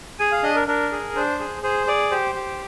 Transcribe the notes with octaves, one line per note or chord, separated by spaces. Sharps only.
G#4 G#5
F5
D4 D#5
A#4
D4 A#4
G#4
D4 C5
G#4
G#4 C5
G#4 D5
G4 C5
G4